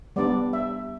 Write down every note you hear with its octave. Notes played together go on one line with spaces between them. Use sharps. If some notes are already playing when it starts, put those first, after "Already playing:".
G3 B3 D4 D5
E5